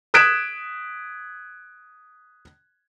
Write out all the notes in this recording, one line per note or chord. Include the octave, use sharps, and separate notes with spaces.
D#6 F#6 G#6 B6 D7 E7